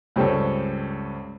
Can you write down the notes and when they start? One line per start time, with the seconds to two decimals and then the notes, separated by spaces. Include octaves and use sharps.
0.16 C#2 G2 C4 C#4 A4 C#5